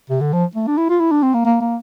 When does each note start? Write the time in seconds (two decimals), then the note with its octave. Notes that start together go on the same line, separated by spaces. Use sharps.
0.10 C3
0.21 D3
0.33 F3
0.55 A3
0.67 D4
0.78 E4
0.90 F4
1.00 E4
1.11 D4
1.23 C4
1.34 A#3
1.45 A#3
1.61 A#3